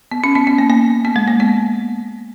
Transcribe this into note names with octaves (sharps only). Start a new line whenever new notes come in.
B3
C#4
B3
B3
A#3
A#3
B3
G#3
A#3
B3